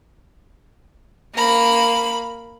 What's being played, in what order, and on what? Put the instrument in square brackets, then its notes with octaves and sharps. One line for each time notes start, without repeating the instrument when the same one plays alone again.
[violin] A#3 B5